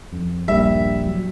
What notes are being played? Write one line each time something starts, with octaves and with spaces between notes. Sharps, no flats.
F2
D#1 A#1 G2 G3 A#3 E5
F#3